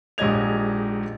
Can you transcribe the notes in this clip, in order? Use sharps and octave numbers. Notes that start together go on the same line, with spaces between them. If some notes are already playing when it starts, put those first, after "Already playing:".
A#1 G#2 G4 D#5 G#6 F7